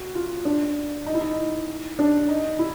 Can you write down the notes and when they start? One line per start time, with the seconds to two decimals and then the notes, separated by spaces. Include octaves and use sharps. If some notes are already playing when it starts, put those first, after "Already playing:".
Already playing: F#4
0.15 F4
0.45 D4
1.06 D#4
1.14 E4
1.21 D#4
1.99 D4
2.28 D#4
2.59 E4